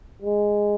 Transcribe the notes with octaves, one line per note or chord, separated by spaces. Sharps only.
G#3